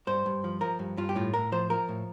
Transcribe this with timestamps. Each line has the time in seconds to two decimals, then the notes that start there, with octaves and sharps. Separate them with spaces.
0.07 G2 C5
0.26 G2
0.44 F3
0.61 F3 A#4
0.79 G2
0.97 G2 F4
1.09 G4
1.15 A2 F4
1.34 A2 A#4
1.52 F3 C5
1.70 F3 A#4
1.89 A2